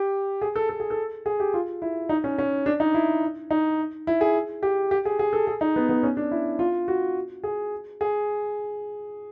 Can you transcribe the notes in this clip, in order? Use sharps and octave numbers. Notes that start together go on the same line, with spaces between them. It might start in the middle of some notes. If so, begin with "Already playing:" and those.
Already playing: G4
G#4
A4
A4
G#4
A4
G#4
G4
F4
E4
D#4
C#4
C#4
D4
D#4
E4
D#4
E4
G#4
G4
G4
G#4
G#4
A4
G#4
D#4
B3
B3
C#4
D4
E4
F4
F#4
G#4
G#4